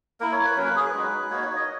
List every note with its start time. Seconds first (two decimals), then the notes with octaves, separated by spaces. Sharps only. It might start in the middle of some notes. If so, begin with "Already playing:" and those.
0.20 A#3 E4 A#4
0.32 C#5
0.45 B4
0.56 F#3 A#3 C#4 A#4
0.66 B4
0.76 G#4
0.85 B4
0.94 G#3 D#4 F#4
1.30 A#3 D#4 F#4 C#5
1.42 C#5
1.56 D#5